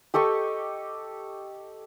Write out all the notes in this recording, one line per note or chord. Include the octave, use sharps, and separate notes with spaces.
G4 A4 D#5 C#6